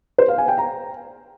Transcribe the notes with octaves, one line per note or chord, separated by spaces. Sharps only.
C5
F5
G#5
G5
A#5